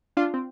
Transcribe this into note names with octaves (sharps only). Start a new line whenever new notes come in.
D4 F4
C4